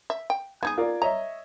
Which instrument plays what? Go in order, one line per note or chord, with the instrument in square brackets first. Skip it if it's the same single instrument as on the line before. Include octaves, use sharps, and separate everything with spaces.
[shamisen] E5
G5
[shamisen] B3 D#4 G#4 [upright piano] G#6
[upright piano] F4 A#4 D5
[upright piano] C#5 D#5 E5 [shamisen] A#5